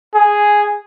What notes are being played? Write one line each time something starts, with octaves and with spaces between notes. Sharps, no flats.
G#4